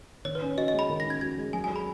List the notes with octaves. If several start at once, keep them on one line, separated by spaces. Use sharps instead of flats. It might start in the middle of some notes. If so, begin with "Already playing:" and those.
D#3 C#5
B4
C#4
F#4 D#5
D#5
G#3
B5
D#3
A#6
C#4
G#6
F#4 G#6
G#3
F#3 G#5
G#5
G#4
B5